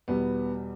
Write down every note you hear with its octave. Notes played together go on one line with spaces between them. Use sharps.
E2 B2 G3 B3